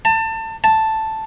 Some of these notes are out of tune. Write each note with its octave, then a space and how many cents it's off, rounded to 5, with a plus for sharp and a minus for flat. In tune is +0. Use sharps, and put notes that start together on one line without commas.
A5 +25
A5 +0